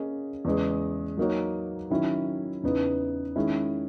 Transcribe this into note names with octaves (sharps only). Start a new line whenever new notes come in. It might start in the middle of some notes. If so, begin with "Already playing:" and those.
Already playing: A#3 C#4 G#4 D#5
E2 C#3 G#3
F#3 A#3 D#4 F#4 C#5
D#3 F#3 C#4 E4
E2 C#3 E3 B3 D#4
D#3 G#3 C#4 E4